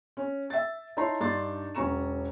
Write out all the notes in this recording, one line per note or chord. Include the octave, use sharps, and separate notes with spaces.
C#4
E5 A6
D#4 E4 C#5 A5 A#5 C6
G2 D4 D#4 C6 A6
E1 F#3 C#4 A#5 C#6 E7